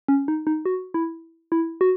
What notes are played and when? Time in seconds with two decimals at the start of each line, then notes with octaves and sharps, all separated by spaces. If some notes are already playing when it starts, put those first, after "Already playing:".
0.08 C#4
0.28 D#4
0.47 D#4
0.65 F#4
0.94 E4
1.52 E4
1.81 F#4